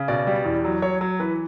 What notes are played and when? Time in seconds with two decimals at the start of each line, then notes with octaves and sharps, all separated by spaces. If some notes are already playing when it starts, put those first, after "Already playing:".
Already playing: C#3
0.08 B2 D5
0.27 G3
0.45 E2
0.65 F#3
0.82 F#3 C#5
1.01 F#3
1.20 E3 B4